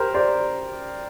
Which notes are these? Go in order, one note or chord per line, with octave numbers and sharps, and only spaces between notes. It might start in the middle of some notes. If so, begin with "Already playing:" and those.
Already playing: G4 A#4 C5
C5 D5